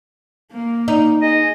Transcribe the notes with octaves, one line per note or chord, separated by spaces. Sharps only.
A#3
D#4
G#4 D#5